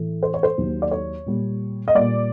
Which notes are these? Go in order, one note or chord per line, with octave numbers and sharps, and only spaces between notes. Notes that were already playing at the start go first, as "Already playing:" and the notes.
Already playing: A2 E3 A3
C5
C#5
C5
D#2 D#3 F#3
D5
C#5
A#2 G3
D#5
A#2 G3 D5